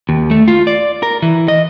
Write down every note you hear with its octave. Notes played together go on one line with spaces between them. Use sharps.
D#2
A3
F4
D5
A#4
E3
D#5